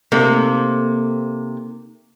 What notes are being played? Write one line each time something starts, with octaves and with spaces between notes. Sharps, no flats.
C3 A#3 D#4 A4